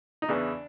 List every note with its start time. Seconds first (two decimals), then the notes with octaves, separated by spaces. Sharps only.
0.22 D#4
0.28 E2 C#3 E3 D4